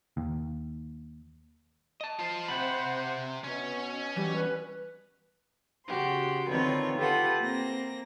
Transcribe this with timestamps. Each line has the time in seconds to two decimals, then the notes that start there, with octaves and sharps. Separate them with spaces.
0.17 D#2
2.01 D#5 A5
2.19 F4 C5
2.48 C3 C5 F#5 B5
3.44 B2 C#4
4.16 E3 G3
4.36 B4
5.86 C#3 F#4 G4 C6
6.48 D3 D#3 C4 F4 B4 C#5
6.97 F4 G4 A4 B4 F#5
7.42 A#3 C4 A#6